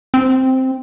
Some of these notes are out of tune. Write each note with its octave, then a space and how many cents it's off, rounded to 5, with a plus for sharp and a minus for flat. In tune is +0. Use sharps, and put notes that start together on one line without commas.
C4 +0